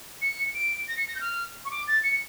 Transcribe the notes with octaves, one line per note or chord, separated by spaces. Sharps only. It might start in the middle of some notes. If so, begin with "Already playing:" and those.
C#7
D7
A#6
C#7
A#6
G6
F6
C#6
D6
A6
C#7